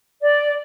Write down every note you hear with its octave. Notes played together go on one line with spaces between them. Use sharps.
D5